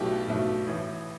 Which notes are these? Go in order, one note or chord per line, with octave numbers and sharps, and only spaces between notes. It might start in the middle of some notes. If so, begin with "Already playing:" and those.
Already playing: B1 B2 A3 E4 G4
B1 B2 A3 E4
A1 A2 E3